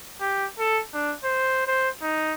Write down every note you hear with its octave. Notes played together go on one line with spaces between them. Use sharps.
G4
A4
D4
C5
C5
D#4